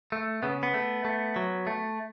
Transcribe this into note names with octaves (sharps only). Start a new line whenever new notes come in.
A3
C#3 B3
B3
A3
A3
F#3
A3